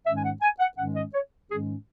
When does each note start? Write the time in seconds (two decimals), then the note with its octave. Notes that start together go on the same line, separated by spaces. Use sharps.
0.06 G#2 D#3 G#3 C#4 E5
0.17 G#5
0.23 F#5
0.42 G#5
0.60 F#5
0.77 G#2 D#3 G#3 C#4 F#5
0.95 D#5
1.14 C#5
1.50 G#2 D#3 G#3 C#4 G#4